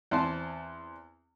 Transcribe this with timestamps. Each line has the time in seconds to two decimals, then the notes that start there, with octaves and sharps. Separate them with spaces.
0.11 E2 C4 C5 A5